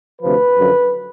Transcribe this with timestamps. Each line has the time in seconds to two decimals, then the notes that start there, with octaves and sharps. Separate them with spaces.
0.21 D2 C3 F3 B4
0.57 F#2 D3 F3